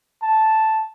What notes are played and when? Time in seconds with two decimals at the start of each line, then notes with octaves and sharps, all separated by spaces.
0.23 A5